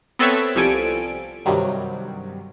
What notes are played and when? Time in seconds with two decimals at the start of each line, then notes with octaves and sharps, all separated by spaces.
0.19 B3 C4 A4 B4 C#5 E5
0.55 C2 F3 G3 A4 G#5 D7
1.46 G2 C3 D#3 F#3 G3